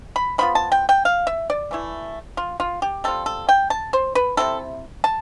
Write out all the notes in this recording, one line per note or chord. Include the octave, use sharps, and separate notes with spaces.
B5
F3 B3 F4 B5
A5
G5
G5
F5
E5
D5
E3 A3 E4
F4
F4
G4
G3 C4 F4 A4
A4
G5
A5
C5
B4
C3 F3 C4 E4 A4
A5